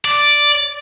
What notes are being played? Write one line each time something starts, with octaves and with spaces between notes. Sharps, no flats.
D5